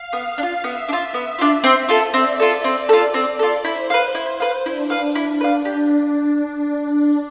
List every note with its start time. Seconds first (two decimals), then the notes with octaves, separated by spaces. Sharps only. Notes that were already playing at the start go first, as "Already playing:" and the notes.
Already playing: F5
0.13 B3 F5
0.38 D4
0.43 F4
0.64 B3 E5
0.88 D4
0.93 F4
1.14 B3
1.39 D4 F4
1.64 C4
1.89 F4 A4
2.14 C4 D5
2.40 F4 A4
2.64 C4
2.89 F4 A4
3.14 C4 D5
3.39 F4 A4
3.65 E4 C5
3.90 B4 F5
4.15 E4
4.40 B4 F5
4.65 D4 E4
4.90 B4 F5
5.15 D4 E4
5.41 B4 F5
5.65 D4 G4